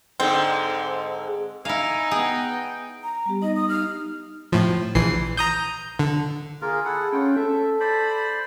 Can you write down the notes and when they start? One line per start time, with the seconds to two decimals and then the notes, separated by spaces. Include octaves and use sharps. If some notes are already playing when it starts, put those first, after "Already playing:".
0.20 G#2 D3 G#3 C4
1.65 D#4 E4 F5 G#5
2.11 B3 G#4 G5
3.03 A#5
3.26 G3 B3 G4
3.42 D#4 D#5
3.55 D#6
3.69 D#4 F6
4.52 A2 F3
4.95 A#1 E3 C7
5.37 A#5 D#6 G6
5.99 D3
6.61 A#3 F4 G#4 A#4
6.85 E4 A4 F#5
7.13 A3 C#4 F4 G5
7.36 A4 E5
7.80 C5 D5 B5